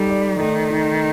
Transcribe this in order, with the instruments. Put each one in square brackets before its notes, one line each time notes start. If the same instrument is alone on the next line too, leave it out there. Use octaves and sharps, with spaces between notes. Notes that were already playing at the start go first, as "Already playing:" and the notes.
Already playing: [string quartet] G3 [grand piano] D#4 A4
[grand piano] D5
[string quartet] D#3 [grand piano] A3
[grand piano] D#4